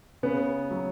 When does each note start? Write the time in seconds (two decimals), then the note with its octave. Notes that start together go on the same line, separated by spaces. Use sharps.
0.23 C#3 B3
0.71 F#3